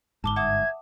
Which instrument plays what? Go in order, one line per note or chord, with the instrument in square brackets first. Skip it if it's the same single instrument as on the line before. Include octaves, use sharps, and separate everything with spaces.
[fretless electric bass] G1 G#2 [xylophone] A5 D6 G7
[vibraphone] E5 [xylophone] F#5 D6 D#6 [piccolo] G#6